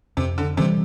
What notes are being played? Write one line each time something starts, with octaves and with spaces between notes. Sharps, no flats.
F2 C3
D3
C3 E3 G3